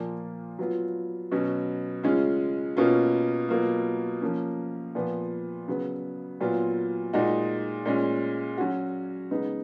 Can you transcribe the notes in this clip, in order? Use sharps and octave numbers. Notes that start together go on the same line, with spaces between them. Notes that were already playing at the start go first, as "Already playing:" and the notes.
Already playing: A#2 F3 A#3
F#3 B3 F4
B2 F#3 C#4
C#3 G#3 C#4 F4
B2 A#3 C#4 F4
B2 F#3 A#3 F4
F3 A#3 C#4
A#2 F3 B3
C#3 F#3 B3
A#2 F#3 B3 F4
A#2 G#3 D#4 F#4
A#2 G#3 C#4
F#3 C#4 F#4
C#3 G#3 B3 D#4